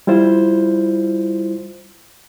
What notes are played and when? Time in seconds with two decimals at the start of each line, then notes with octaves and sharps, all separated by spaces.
0.07 G3 E4 F4 C5